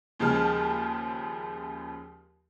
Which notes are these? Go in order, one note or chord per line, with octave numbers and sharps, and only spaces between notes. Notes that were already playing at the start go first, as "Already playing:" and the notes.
D#2 C#3 F3 G#3 A5 F6